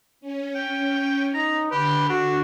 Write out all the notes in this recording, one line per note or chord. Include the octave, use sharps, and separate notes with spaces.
C#4
G5
D#4 A#5
D3 G4 B4
D4 F#4